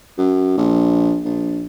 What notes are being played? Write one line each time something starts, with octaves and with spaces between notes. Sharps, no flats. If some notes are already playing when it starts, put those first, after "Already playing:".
F#2
A#1
A#1